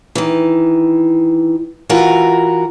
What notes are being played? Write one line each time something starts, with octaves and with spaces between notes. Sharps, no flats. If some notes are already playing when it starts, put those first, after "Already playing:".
D#3 E3
E3 F4 F#4 A#4